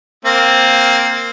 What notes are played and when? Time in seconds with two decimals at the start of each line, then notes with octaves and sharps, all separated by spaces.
0.25 A#3 C4